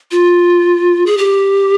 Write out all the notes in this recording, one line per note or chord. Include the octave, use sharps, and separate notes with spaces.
F4
G#4
G4